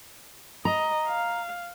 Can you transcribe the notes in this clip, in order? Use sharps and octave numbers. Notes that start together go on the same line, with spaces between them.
D#5 A#5
F5